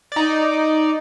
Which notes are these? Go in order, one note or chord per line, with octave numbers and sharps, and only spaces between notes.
D#4 D5